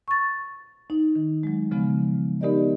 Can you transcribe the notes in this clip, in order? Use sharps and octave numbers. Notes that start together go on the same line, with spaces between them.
C#6 A6
D#4
D#3
F#3 G#3
C#3 F3 G#3 B3
B3 D#4 G4 A#4 D5 D#5